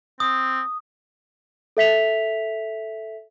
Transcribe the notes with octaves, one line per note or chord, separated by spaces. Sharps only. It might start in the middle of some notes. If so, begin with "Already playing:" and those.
C4 D#6
A4 E5 B6 F7